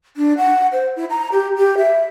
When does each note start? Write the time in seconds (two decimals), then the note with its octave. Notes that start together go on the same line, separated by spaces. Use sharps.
0.17 D4
0.38 F#5
0.72 C5
0.96 E4
1.10 A#5
1.32 G4
1.57 G4
1.78 E5